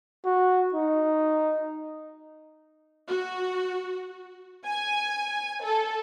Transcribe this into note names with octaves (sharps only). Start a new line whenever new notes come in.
F#4
D#4
F#4
G#5
A4